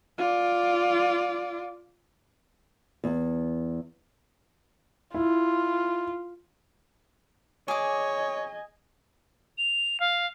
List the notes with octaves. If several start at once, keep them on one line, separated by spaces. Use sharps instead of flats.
F4 D5
E2
E4 F4
G#4 C#5 D#5 G#5 D6
F7
F5